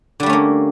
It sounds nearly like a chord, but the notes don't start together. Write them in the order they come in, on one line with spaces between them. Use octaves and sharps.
D3 G3 A3 C#4 A#3